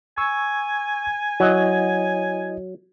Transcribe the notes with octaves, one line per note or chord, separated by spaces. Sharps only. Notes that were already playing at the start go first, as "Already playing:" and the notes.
G#5 C#6 E6
F#3 E4 D#5